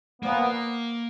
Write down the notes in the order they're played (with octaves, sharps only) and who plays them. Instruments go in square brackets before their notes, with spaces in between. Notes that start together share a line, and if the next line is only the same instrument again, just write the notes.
[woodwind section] A#2 F3 B3 [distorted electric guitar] A#3